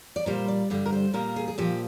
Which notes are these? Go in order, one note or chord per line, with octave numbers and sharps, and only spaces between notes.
D5
A#2 G3 A#3 C5
D5
G2 D3 G3 D5
A#4
C5
A#2 G3 A#3 A#4
G#4
G#4
A#2 F3 A#3 G4